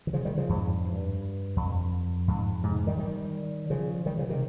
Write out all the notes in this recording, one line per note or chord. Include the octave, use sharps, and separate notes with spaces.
D#3
C#3 F3
D#3 G3
C#3 F3
F2 G#2
G2
F2
F2 G#2
G#2 C3
D#3 G3
D#3 G3
C#3 F3
D#3 G3
C#3 F3
C3 D#3